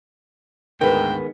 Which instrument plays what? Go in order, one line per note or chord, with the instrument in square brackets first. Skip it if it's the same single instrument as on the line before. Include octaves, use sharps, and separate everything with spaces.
[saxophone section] D2 G#2 [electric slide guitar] D#3 G#3 B3 [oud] A#4 B4 [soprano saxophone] G5